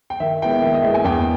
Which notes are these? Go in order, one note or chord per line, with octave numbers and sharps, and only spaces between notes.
G5
D#3 E5
G#3 B3 E4 G5
D#3 E5
D#5
G#3 B3 E4 E5
G#5
E2 G5